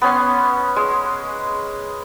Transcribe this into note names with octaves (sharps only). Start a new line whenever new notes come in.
B3 C#4 C6
G#3